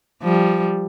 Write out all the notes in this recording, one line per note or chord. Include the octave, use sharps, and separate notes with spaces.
F3 G3